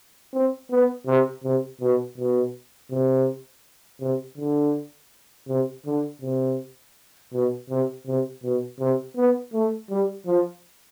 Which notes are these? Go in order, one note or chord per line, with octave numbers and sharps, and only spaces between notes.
C4
B3
C3
C3
B2
B2
C3
C3
D3
C3
D3
C3
B2
C3
C3
B2
C3
B3
A3
G3
F3